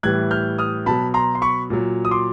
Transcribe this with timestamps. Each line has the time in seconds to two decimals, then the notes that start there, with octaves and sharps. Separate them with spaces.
0.03 A2 E3 G3 F#6 G#6
0.31 F6 G6
0.59 D#6 F6
0.86 B2 F#3 A5 B5
1.14 A#5 C6
1.35 C6
1.42 B5 C#6
1.70 A#2 F#3
2.05 D#6
2.11 C6 D6